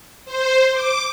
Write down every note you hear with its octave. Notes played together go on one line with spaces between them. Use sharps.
C5
D6